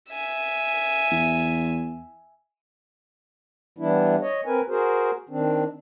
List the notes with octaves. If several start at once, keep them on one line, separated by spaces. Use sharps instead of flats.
E5 G#5
E2
E3 G3 B3 D4 E4
C#5 D#5
C4 A#4 B4 G#5
F#4 G#4 A#4 C5
D#3 C4 D4